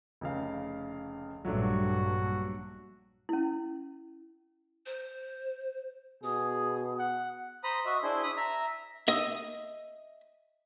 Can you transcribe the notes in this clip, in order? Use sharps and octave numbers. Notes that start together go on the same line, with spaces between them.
F1 C#3 F5
A#1 G2 A#2 F#3 A3 D4 F#4
C#4 E4
C5
B2 G#4 D#6
F#5
C5 A#5 B5 D#6
F#4 D#5 E5
D4 E4 G#4 C5
B5 D#6
E5 A#5
D#5 E5